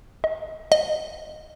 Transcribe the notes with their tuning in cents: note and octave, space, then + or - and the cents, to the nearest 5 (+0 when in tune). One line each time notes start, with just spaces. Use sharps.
D#5 +25
D#5 -5